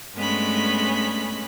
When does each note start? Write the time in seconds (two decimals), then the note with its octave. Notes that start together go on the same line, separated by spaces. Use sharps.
0.15 G2 G#3 A3 B3 C#4 B5